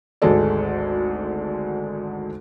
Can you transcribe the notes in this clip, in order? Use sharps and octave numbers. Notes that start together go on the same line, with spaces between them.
G#1 D2 G#3 A4 D5